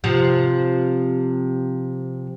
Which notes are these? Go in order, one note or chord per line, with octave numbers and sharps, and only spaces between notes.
C3 F3